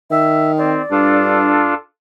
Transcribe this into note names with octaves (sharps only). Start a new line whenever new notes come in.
D#3 E5
C4 D5
G2 D4 F4 A4